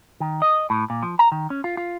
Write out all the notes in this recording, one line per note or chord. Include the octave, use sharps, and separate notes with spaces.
D#3
D#5
A2
A#2
F3
A#5
D#3
C#4
F4
F4